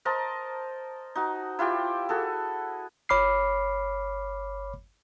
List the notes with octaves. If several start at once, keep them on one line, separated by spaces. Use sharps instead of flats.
A#4 C5 D#5 A5
D#4 F#4
E4 F4 G4 G5
F#4 G#4 A4
G1 C#5 B5 D6 F6 C7